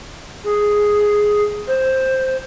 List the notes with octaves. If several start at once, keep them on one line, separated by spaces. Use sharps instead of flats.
G#4
C5